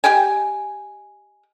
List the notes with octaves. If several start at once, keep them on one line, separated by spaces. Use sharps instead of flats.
G4 D#5 G5 G#5